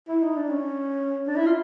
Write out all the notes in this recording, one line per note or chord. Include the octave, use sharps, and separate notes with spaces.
E4
D#4
D4
C#4
D4
E4
F4